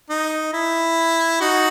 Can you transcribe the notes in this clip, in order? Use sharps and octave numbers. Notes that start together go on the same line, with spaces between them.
D#4
E4
D#4 F#4